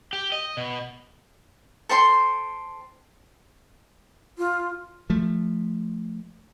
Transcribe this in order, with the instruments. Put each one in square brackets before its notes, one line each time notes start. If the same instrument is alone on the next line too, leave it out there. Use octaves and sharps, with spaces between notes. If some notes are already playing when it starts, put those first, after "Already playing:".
[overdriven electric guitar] G4
D#5
B2
[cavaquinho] A4 C5 G5 C6
[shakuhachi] F4
[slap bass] F3 A3